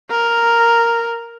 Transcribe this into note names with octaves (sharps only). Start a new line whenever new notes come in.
A#4